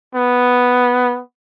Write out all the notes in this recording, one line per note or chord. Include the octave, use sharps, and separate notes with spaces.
B3